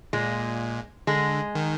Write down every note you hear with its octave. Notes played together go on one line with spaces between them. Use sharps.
A#2 G#3
D3 G#3
D#3